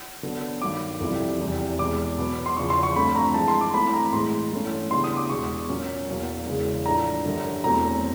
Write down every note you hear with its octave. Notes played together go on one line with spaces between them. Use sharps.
D3 F#3 B3 D4
G2 D#3 F#3 D6
F2 C3 E3 G3
E2 C3 E3 G3
E2 B2 G#3 D6
B2 F#3 B3
C6
E2 C#3 F3 C#6
C6
C#6
G2 D3 F3 A3 C4 B5
A#5
G2 E3 G#3 A5
C6
D6
G2 E3 A3 C4 B5
A#5
A2 E3 G#3 C6
G2 E3 A3 C#4
C#3 E3 G3 B3 D4 C6
D#6
D6
E2 B2 G#3 C#6
A#2 F#3 A#3 C#4
E2 B2 F#3 A#3
E2 C#3 E3 G#3
A2 F3 A3 D4 A#5
F#2 D3 G3
E2 B2 F#3 A3 C4 A#5